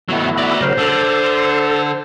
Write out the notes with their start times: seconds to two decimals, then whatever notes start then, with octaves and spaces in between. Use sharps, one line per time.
0.09 D#3 F#3 A3 B3 E4
0.37 F#4 D5 E5
0.61 C#3 F#3 A#4 C5
0.78 D3 A4